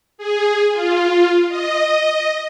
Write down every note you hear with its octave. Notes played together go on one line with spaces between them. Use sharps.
G#4
F4
D#5